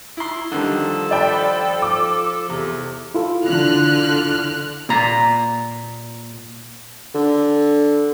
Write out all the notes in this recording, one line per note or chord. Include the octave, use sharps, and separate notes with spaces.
E4 C6
D3 D#3 F3 G3 A4
D5 G5 B5
D6
E2 C3
E4 F4 A4
D3 F6 F#6
A#2 A#5
D3